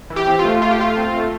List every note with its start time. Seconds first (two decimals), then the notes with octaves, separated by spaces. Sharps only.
0.10 E3
0.16 G4
0.27 C4
0.39 F4
0.45 A3
0.62 A3 F4
0.71 G4
0.79 A3 F4
0.97 C4
1.14 A3